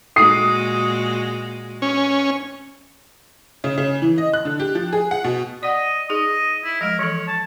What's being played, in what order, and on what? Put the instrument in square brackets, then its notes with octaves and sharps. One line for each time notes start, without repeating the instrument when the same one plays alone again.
[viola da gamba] A#2 G#3 F#4 [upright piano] D#6 C7
[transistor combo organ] C#4
[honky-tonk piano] C#3
C#3
E3
D#5
F#6
D3
G4
F3
G#4
F#5
B2
[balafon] D5 F#5 [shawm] D#5
[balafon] D#4 G#4 [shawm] D#5
[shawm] E4
[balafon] F3 G#3 [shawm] A#4
[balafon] E3 F3 A4 [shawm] C#5
[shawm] A5